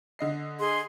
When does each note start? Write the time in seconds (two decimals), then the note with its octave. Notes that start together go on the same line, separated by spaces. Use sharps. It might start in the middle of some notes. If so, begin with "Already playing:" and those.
0.19 D3 D#5 C7
0.60 G#4 C6